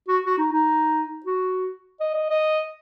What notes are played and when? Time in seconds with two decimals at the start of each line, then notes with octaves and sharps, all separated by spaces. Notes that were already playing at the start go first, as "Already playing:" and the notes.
0.08 F#4
0.26 F#4
0.38 D#4
0.52 D#4
1.26 F#4
2.00 D#5
2.14 D#5
2.30 D#5